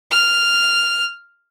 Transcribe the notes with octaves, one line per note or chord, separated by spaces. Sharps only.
F6